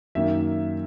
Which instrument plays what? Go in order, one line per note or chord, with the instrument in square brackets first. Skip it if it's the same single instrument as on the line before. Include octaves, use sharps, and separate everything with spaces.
[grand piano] F#2 D#3 A#3 E5